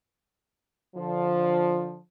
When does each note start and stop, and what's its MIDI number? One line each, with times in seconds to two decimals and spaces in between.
0.95 1.97 50
0.95 1.97 53